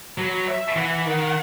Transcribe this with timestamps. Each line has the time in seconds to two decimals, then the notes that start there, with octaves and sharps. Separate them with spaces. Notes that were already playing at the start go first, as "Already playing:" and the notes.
0.18 F#3 B4
0.48 E5
0.76 E3 F#5
1.05 D#3